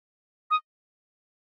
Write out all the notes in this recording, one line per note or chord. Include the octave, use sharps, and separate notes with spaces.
D#6